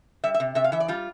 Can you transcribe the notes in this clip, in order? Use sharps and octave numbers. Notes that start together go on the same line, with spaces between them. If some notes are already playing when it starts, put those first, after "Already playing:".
G3 E5
E5
C3
C3 E5
F5
E3 E5
D5
G3 F4